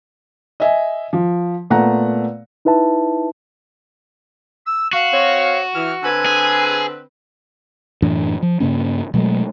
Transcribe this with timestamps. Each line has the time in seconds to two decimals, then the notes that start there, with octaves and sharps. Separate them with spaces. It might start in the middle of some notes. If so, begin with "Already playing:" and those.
0.60 D#5 E5 G#5
1.13 F3
1.70 A#2 A3 B3 F#5 A#5
2.65 D#4 E4 B4 E5 A5
4.66 E6
4.93 F#4 F5
5.13 C4 C#5
5.74 E3 F6
6.03 D3 C4 B4 G#5
6.26 G#4
8.02 F#2 A2 E3 D4
8.42 F3
8.60 G2 C#3 A#3 C#4
9.14 B2 F#3 G#3 A3